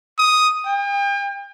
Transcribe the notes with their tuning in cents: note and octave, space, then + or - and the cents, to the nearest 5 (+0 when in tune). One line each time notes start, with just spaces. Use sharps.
D#6 +5
G5 +40